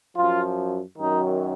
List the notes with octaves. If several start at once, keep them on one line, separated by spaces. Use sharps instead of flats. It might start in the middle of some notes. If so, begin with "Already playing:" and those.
F#2 F3 F4
F#2 D#3 F#3 D#4